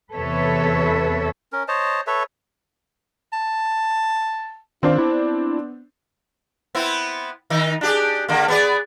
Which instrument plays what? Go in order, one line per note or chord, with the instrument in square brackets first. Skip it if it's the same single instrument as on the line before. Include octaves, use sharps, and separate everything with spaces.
[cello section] E2 C3 A4 B4 C#5 E5
[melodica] C#4 A#4
C5 C#5 D#5 A5
A4 B4 C#5 E5
[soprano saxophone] A5
[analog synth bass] D#3 [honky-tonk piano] C4 D4 [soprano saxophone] F4
[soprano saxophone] B3 [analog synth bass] E4
[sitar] B3 C4 E4
D#3 D#4
D4 G4 G#4
D3 A#3
B3 G#4 D5